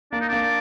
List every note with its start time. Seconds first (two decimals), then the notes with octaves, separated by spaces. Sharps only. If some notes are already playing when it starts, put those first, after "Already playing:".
0.12 A#3 D4
0.21 D#4
0.28 A#3 D4